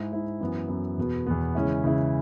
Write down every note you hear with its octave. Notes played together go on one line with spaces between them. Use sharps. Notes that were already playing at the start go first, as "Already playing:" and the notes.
Already playing: G#2 G#3 E4
G#2 G#3 E4
F#2 E3 B3 E4
F#2 E3 B3 E4
E2 B2 B3
E2 B2 B3
C#3 E3 G#3 C#4 E4
C#3 E3 G#3 C#4 E4